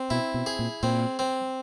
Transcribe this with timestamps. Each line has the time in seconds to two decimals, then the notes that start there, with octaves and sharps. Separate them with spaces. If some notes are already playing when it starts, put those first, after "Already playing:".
Already playing: C4
0.10 B2 E4
0.34 B2
0.46 G#4
0.59 A#2
0.83 A#2 C4
1.19 C4